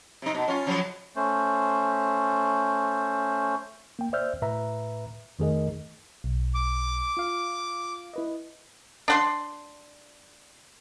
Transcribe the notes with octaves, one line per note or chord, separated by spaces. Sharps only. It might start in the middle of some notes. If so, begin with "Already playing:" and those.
C3 D#4
B2
C#4 F4
C#3 F3 F#3
A3 C#4 C5
A#3 G5
C5 D5 E5 E6 F6 G6
A2 B4 E5 A#5
F2 D#3 A3 G#4 A#4 D#5
B1
D6
F4 F5
E4 B4 D#5
D4 F#5 C6